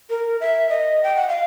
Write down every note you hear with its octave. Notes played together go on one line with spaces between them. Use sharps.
A#4
E5
D#5
G5
F#5
F5